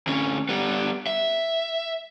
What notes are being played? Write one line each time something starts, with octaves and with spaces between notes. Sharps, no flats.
D2 C#4
G3 B3
E5